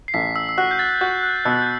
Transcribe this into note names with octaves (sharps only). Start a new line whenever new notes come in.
C7
A1 B6
E6
E6
F#4 F#6
G6
A6
F#4 G6
F#6
B2 E6
G6